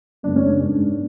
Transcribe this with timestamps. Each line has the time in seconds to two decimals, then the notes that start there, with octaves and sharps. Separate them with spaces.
0.23 F#2 C#3 G#3 B3 D4
0.36 C#4
0.48 D4
0.59 G#2 G#3 B3